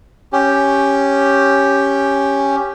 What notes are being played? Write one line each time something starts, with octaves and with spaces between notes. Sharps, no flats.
C#4 G4